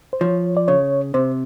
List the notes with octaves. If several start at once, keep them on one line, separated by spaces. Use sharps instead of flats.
C5
F3 C#5
D5
C#3 C#5
C3 C5